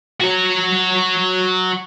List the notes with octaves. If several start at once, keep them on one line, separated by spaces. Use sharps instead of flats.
F#4 C#5